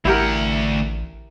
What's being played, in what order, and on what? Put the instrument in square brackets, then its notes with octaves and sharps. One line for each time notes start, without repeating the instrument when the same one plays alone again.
[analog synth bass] A1 [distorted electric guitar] D2 F#5 [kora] E4 G4 A#4